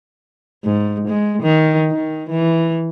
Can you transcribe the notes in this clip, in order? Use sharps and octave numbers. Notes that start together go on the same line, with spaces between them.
G#2
G#3
D#3
D#3
E3